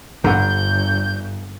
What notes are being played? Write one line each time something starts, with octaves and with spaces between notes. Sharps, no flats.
G1 G2 D3 F#5 A#5 G6